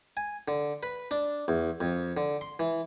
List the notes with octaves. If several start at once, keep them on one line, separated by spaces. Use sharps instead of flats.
G#5
D3
B4
D4
E2
F2
D3
C6
E3